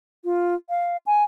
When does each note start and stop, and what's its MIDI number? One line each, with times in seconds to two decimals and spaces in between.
0.24 0.54 65
0.69 0.97 77
1.06 1.24 80